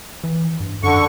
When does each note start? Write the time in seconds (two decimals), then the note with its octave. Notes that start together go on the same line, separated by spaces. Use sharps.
0.24 E3
0.60 G2
0.83 F#2 D3 C#6